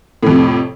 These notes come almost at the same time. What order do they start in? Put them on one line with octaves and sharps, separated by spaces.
A2 F2 C3